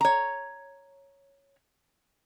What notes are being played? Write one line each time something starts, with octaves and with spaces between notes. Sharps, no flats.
C#5 A#5